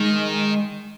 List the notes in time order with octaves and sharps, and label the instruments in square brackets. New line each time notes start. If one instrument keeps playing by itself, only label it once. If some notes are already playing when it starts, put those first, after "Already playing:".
Already playing: [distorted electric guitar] D#3 [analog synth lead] G#3